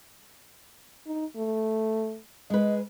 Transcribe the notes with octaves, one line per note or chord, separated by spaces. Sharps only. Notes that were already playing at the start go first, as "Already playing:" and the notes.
D#4
A3
G#3 B4 D#5